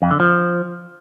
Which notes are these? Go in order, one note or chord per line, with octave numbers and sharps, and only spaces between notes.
F2
D3
F3